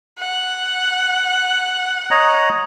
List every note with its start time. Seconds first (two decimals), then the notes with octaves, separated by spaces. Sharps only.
0.19 F#5
2.11 C#5 D#5 A#5